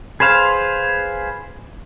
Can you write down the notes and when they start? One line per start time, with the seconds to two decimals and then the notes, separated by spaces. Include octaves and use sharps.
0.20 G#4 B4 C5 F5